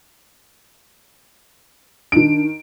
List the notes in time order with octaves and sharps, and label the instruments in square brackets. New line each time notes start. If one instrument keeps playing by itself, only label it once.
[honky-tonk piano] D#3 D7 [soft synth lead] D4